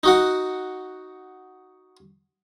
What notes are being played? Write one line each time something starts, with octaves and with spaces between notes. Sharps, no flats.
D#4 F#4 F#5